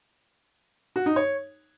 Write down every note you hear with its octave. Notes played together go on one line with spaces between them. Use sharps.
F#4
D#4
C#5